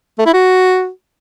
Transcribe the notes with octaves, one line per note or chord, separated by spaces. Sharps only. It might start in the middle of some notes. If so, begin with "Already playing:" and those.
A3
E4
F#4